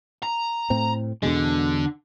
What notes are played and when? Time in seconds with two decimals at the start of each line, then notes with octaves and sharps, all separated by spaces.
0.23 A#5
0.70 A2 C4
1.23 E2 B2 D3 G#3